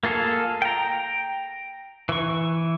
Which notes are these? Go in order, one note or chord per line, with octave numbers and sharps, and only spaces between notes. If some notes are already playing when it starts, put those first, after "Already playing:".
A#3 F4 G#4 A4 F5
G5 A#5
E3 C#6